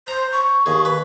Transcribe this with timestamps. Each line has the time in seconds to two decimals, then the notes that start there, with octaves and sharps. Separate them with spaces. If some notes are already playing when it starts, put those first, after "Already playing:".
0.08 C5 A#5
0.33 C#6
0.66 D#2 G#4
0.85 B4